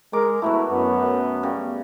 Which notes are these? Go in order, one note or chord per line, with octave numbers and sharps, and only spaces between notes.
G#3 A#4 D6
B2 F#3 A3 E4
F#2 B3
C#3 G3